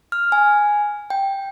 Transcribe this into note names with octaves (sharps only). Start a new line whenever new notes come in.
F6
G#5
G5